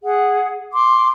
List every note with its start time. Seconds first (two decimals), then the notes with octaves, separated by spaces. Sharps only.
0.04 G#4 F#5
0.73 C6 D6